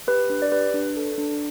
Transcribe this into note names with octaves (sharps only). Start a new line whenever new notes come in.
G4 B4
D4
D5
G4 B4
D4
A4
D4